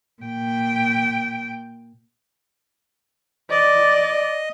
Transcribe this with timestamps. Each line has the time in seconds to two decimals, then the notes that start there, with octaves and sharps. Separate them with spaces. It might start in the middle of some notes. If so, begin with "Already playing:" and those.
0.22 A#2 G5
3.50 D5 D#5